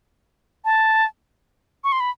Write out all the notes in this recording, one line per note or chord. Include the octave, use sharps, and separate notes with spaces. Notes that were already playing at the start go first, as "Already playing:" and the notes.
A5
C#6
C6
B5